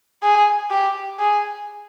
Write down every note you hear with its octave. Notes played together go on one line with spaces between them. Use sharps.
G#4
G4
G#4